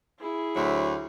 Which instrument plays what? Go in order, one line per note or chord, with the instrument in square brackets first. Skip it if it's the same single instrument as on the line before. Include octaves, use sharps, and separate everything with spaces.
[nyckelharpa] E4 G#4
[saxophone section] D2 F#3 E5